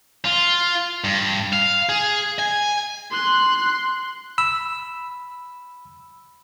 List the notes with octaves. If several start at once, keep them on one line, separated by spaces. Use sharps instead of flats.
F4
G2
F5
G#4
G#5
C6 F#6
B5 E6